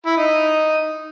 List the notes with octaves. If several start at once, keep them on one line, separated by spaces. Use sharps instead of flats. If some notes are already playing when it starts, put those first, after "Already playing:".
E4
D#4